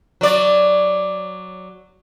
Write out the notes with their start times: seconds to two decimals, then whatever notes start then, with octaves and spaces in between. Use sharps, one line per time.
0.21 F#3 D5